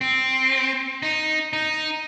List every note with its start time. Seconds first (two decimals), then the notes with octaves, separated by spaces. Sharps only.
0.01 C4
1.02 D#4
1.53 D#4